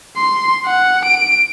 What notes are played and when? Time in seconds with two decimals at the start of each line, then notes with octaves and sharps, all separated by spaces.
0.17 C6
0.66 F#5
1.05 D7